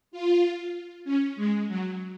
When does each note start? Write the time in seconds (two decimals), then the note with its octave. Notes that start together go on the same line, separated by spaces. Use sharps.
0.11 F4
1.04 C#4
1.36 G#3
1.67 F#3